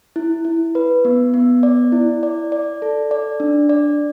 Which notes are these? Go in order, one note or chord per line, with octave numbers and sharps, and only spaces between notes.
E4
E4
B4
B3
B3
D5
E4
D5
D5
A4
D5
D4
D5